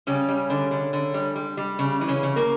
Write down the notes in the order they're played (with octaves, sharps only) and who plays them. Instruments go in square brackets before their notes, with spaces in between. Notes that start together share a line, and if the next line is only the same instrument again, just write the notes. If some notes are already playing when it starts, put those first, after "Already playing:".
[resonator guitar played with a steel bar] C#3 G3 C#4
G3
D3
D3
D3
G3
G3
G3
C#3
E3
C#3 C#4
C#3
A#3 A#4